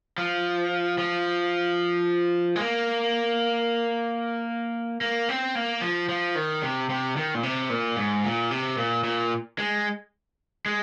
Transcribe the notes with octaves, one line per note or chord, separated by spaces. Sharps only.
F3
F3
G#3
A#3
A#3
C4
A#3
F3
F3
D#3
C3
C3
D#3
A#2
C3
A#2
G#2
A#2
C3
A#2
A#2
G#3
G#3